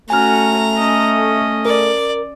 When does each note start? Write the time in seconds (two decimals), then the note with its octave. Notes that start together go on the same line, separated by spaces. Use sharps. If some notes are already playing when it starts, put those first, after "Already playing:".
0.10 A3 C#4 F#4 G#5 A#5 F6
0.78 C#4 D#5
1.65 A#4 D5